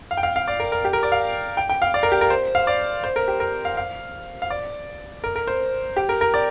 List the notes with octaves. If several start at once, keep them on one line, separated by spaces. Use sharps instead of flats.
F5
G5
F5
F5
D5
A#4
A#4
G4
A#4
D5
F5
G5
G5
F5
D5
A#4
G4
A#4
C5
F5
D5
C5
A#4
G4
A#4
F5
F5
F5
D5
A#4
A#4
C5
G4
A#4
A#4
D5